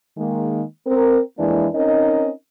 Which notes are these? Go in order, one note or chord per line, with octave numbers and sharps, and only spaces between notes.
D#3 G#3 A#3
C4 A#4
F2 E3 G#3 A#3 D4 E4
C4 C#4 D#4 A#4 D#5